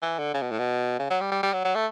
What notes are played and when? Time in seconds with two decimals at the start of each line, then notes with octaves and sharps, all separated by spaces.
0.02 E3
0.18 D3
0.34 C#3
0.42 B2
0.51 A2
0.59 B2
0.99 C#3
1.10 F#3
1.21 G3
1.31 G3
1.43 G3
1.53 F#3
1.64 F#3
1.75 A3